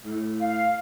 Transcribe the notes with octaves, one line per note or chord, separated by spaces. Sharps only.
A2
F5